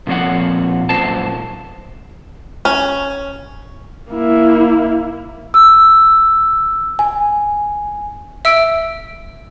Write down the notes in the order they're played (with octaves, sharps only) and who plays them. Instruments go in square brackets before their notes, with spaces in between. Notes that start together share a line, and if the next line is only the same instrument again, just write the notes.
[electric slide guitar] A#2 F3 C4 C#5 F#5
F#2 A#2 C5 A5
[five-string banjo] C#4
[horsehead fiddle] A#3 E4
[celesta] E6
G#5
[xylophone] E5 E6 D7